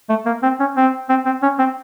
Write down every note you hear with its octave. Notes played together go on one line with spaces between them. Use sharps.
A3
A#3
C4
C#4
C4
C4
C4
C#4
C4